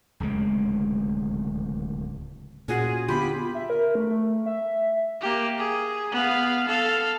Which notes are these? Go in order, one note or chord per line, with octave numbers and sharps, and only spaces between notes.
D1 C#2 C3 G#3
A#2 C#4 F4 F#4 G#4
D3 B3 F4 G4 B5
E5
A#4
A3
A3
E5
A#3 G4
G#4
B3 F5
A4 F5